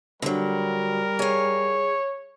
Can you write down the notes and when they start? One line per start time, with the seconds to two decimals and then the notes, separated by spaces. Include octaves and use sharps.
0.22 D3 F#3 G3 A#4
1.19 G#4 C#5 F5